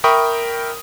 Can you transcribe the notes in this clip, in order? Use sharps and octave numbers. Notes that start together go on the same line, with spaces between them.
A#4 E5 G5 B5 C#6 D#6